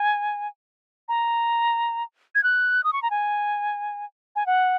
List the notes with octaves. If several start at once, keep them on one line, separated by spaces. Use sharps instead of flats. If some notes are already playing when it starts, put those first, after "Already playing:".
Already playing: G#5
A#5
G#6
F#6
D#6
C#6
A#5
G#5
G#5
F#5